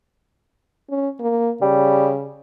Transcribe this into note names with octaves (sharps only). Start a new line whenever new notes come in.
C#4
A#3
C#3 G3